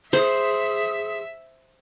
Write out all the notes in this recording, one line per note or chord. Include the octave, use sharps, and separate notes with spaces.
G#4 C5 E5